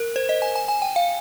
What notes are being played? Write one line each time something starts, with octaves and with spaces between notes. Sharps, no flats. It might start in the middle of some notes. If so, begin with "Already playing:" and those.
Already playing: A#4
C5
D#5
G#5
G#5
G#5
G5
F5